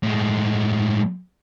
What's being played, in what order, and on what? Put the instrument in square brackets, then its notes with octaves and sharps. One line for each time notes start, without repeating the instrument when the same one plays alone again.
[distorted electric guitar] A2 G#3